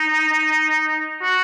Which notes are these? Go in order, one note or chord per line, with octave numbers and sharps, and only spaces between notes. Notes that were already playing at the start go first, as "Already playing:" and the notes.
Already playing: D#4
F#4